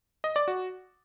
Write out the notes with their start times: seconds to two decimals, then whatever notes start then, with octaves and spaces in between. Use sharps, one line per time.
0.24 D#5
0.36 D5
0.48 F#4